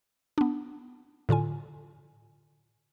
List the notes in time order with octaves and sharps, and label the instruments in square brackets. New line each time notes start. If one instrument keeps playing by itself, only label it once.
[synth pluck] B3 D4
A2 D3 F4 G#5